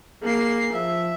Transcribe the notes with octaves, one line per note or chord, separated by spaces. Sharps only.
A#3 G#4 C7
F3 E5